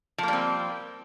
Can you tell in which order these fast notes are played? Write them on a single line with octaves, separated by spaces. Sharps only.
F3 A#3 G3 C4